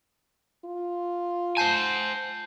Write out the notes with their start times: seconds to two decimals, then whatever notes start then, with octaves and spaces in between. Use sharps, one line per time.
0.65 F4
1.57 C5 G#5 A5 G6 C7